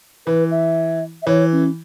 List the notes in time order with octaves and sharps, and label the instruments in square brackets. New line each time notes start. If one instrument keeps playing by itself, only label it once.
[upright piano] E3 [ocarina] B4
[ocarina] E5
E5
[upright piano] E3 [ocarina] C#5
[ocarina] C#4